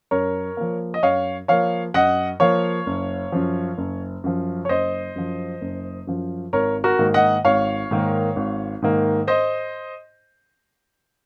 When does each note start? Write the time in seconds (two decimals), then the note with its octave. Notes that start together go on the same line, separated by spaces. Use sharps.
0.11 F#2 A#4 C#5
0.57 F3 A#3
0.94 D#5
1.03 F#2 C#5 F5
1.48 F3 A#3 C#5 F5
1.94 F#2 D#5 F#5
2.40 F3 A#3 C#5 F5
2.86 F#1
3.32 F#2 F3
3.78 F#1
4.24 F#2 F3
4.65 C#5
4.69 F#1 C5 D#5
5.16 F#2 F3
5.61 F#1
6.07 F#2 F3
6.53 G#1 A#4 C#5
6.84 F#4 A#4
6.99 G#2 D#3 A#3
7.14 D#5 F#5
7.45 G#1 C#5 F5
7.91 G#2 D#3 A#3
8.36 G#1
8.82 G#2 D#3 A#3
9.27 C5 D#5